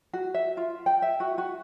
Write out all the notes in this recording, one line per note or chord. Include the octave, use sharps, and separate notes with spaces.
F#4
E5
F4
G5
E5
F#4
F#4